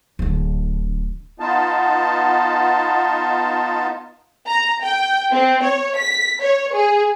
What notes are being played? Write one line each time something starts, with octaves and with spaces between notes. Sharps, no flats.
D1 D3
B3 D#4 F4 A5
A#5
G5
C4
C#5
B6
C#5
G#4